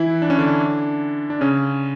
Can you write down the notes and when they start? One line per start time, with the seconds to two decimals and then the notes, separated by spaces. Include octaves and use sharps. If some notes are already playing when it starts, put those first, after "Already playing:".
Already playing: E3 E4
0.22 D4
0.30 C#4
0.38 D3 D4
1.30 D4
1.41 C#3 C#4